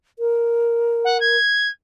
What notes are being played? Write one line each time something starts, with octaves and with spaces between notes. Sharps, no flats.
A#4
F#5
G#6